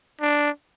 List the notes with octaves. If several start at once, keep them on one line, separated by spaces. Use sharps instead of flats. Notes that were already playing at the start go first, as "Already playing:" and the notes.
D4